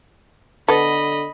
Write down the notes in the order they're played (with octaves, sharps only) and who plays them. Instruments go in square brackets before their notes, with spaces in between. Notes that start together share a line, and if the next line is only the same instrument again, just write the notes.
[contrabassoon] D3 [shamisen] B3 A4 [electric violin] D#5 B5